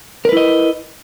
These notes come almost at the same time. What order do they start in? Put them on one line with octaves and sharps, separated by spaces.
A#4 B4 E4 D#5